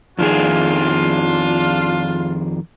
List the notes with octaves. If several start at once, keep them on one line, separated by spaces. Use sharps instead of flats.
F2 D#3 D4 F4 G#4